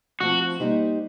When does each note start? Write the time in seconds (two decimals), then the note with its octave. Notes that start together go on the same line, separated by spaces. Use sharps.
0.21 F3 A3 C4 F#4
0.60 G3 A#3 D#4 G4 C5